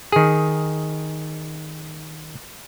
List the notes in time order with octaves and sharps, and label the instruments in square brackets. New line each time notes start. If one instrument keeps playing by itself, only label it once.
[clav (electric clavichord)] D#3 G#4